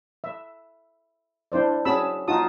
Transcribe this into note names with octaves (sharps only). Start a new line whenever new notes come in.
E5
D4 E4 C5 D5
C#4 F#4 G#4 A5 B5 E6
D#4 F4 F#4 A5 D#6